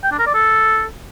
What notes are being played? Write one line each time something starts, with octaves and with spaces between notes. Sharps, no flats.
G5
D4
A#4
D5
A4